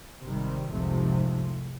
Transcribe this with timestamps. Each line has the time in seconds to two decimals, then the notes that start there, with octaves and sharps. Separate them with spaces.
0.22 G#1 C3 D#3 G3
0.71 F1 C2 G#2 C3 F3 A3